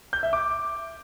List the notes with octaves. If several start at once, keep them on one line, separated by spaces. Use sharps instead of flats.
G6
E5
D6